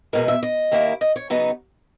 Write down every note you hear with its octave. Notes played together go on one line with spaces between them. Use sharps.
E2 B2 G#3 A#4
E5
D#5
D#2 D#3 A#3 E4
D#5
C#5
C#3 F#3 B3 D#4